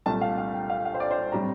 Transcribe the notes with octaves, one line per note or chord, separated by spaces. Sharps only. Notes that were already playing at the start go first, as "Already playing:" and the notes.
C2 A#2 A3 A5
F5
F5
G5
F5
F5
C5
D5
C5
A2 G3 C4 A#5